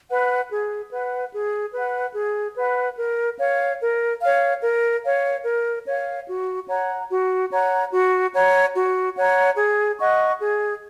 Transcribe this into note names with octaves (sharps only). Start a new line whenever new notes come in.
B4 F#5
G#4
B4 F#5
G#4
B4 F#5
G#4
B4 F#5
A#4
C#5 F5
A#4
C#5 F5
A#4
C#5 F5
A#4
C#5 F5
F#4
C#5 F#5 A#5
F#4
C#5 F#5 A#5
F#4
C#5 F#5 A#5
F#4
C#5 F#5 A#5
G#4
D#5 F#5 C#6
G#4